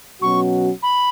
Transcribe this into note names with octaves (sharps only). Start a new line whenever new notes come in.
B2 F#3 C#4 F#4 C#6
B5